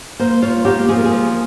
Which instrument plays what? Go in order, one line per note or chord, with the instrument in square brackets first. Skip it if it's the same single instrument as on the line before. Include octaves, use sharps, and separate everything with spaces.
[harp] A#3 [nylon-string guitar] C5
[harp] F4 [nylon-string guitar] C#5
[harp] A#3 [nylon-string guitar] G4
[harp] F3 [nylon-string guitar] G#4
[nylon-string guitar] A#4
G#4
[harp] F3